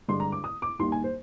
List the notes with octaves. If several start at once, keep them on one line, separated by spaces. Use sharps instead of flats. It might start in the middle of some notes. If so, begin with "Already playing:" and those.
G2 D3 G#3 D4 C6
A#5
D6
D#6
D6
D#2 D#3 G3 A#3 C6
G#5
C5